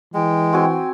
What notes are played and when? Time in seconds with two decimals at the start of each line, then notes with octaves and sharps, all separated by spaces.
0.14 E3 G#3 G5
0.53 C4 F#4 G#5